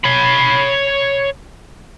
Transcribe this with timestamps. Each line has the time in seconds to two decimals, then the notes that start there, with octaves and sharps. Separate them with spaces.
0.04 C#5 B5